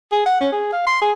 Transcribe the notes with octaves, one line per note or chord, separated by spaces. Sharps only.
G#4
F#5
C#4
G#4
F5
C6
G#4